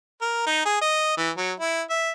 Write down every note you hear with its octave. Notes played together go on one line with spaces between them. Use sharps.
A#4
D#4
G#4
D#5
E3
F#3
E4
E5